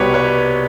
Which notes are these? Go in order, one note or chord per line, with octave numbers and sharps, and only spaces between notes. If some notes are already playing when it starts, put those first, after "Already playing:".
Already playing: C2 B2 G3 G4 B4 C#5
B4 C#5